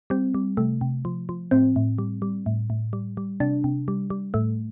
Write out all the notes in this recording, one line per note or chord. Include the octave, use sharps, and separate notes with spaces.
G3 C4
G3
C3 A3
C3
F3
F3
A2 C4
A2
G3
G3
A2
A2
G3
G3
C3 D4
C3
G3
G3
A2 A3